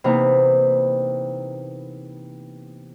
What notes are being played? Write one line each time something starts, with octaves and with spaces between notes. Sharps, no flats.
C3 E3 A#3 B3 D#4